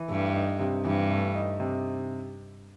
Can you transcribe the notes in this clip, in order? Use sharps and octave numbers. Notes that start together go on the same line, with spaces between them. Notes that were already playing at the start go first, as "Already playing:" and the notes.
Already playing: E3
G2 A3
D#4
C3
G2 E3
A3
D#4
C3